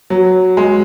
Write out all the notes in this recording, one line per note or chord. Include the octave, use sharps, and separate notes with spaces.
F#3
G#3